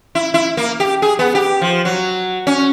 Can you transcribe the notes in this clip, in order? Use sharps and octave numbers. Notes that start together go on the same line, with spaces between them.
E4
E4
A#3
G4
G#4
B3
G4
F3
F#3
C#4